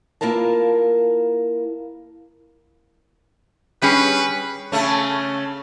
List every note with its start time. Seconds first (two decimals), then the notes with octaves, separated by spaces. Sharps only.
0.21 A#3 E4 F4 A#4 A5
3.82 G3 C#4 G#4 B4
4.72 C#3 A3 C#4